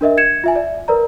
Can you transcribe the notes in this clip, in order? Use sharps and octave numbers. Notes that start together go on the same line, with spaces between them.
D4 A#4 D#5 E5
G#6 C#7 E7
F4 E5 G#5
D5 E5
A#4 B4 D5 A#5